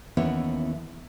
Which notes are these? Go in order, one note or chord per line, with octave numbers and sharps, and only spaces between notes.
D#2 E3 B3 C#4 E4 C#5